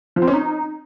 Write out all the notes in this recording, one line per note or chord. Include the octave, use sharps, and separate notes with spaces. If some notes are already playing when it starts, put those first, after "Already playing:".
F3
C4
C#4
D#4